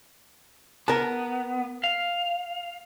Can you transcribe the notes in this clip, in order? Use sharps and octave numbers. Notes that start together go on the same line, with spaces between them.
B3 A#4 A5
F5